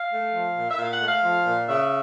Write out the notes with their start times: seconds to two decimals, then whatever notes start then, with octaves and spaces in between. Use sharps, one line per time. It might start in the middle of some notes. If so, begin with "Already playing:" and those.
Already playing: F5
0.10 A3
0.32 F3
0.55 A#2
0.71 E5
0.78 A#2 F5
0.93 F#5
1.00 A3
1.08 F5
1.24 F3
1.46 A#2
1.68 C#3 E5